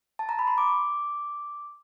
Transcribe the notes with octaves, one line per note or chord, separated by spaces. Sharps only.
A5
A#5
B5
C6
D6